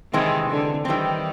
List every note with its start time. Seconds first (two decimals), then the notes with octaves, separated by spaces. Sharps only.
0.13 C3 D#3 E3 G#3 C4 E4
0.50 D3
0.85 D#3 E3 G3 C4